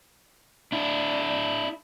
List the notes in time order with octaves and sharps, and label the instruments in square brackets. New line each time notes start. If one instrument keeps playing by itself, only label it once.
[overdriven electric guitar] D4 E4